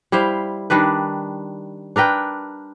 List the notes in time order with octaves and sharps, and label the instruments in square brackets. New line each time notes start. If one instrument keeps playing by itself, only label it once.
[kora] G3 E4 C5 F5
D#3 G3 D4 B4
D4 A#4 B4 G5